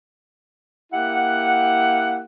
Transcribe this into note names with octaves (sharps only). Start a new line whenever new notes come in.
A#3 E4 G4 F#5